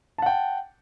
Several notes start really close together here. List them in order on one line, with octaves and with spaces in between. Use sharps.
A5 F#5 G5